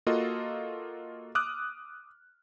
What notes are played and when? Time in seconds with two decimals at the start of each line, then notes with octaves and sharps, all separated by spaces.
0.07 A#3 F4 F#4 A4 D#5
1.35 D6 D#6 F6 F#6